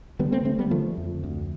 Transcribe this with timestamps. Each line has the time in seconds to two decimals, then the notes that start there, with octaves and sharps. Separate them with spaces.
0.19 D3 G3 B3
0.32 A3 C4
0.45 D3 A3 C4
0.59 G3 B3
0.71 D3 F3 A3
0.97 F2
1.24 D2